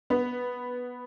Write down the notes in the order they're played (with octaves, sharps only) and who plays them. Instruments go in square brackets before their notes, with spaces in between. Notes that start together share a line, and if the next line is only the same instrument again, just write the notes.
[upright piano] B3